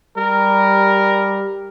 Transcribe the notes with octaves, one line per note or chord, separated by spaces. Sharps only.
G3 A#4